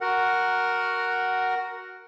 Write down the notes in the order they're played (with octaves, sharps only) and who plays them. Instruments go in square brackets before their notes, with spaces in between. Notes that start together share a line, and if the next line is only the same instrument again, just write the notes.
[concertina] F#4 A#4 F#5